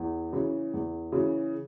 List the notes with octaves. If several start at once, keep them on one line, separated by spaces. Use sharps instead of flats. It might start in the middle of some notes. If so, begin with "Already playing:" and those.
Already playing: E2
C#3 E3
E2
C#3 E3